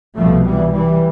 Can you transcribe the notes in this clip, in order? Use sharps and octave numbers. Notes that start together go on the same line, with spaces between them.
C2 B2 F3 A3
E3 G3
E3 G3